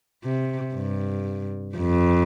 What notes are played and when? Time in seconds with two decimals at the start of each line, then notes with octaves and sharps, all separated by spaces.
0.24 C3
0.75 G2
1.77 F2